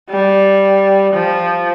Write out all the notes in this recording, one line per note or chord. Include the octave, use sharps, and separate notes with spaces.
G3
F3